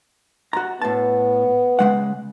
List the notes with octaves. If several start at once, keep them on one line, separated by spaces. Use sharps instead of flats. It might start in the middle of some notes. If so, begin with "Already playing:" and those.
F#4 A#5
A2 B3 A5
C#3 G#3 F#5